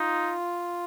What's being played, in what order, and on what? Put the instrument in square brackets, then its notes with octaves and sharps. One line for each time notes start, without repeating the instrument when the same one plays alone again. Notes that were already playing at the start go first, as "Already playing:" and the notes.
Already playing: [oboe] D#4 [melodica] F4